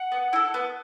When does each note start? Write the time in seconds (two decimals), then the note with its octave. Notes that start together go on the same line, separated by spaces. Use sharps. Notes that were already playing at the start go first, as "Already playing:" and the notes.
Already playing: F#5
0.12 B3
0.33 E4 A4
0.54 B3